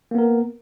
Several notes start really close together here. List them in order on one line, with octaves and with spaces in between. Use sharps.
A#3 B3 A#4